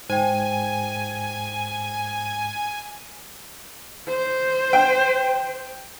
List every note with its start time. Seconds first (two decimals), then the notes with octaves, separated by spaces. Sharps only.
0.10 G#2 C5 G5 G#5
4.08 C5
4.73 G5